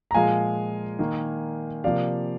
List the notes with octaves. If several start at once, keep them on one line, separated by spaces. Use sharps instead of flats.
A#5
A#2 F3 G#3 F5 G#5
D#3 A#3
C3 F3 A#3 D5 F5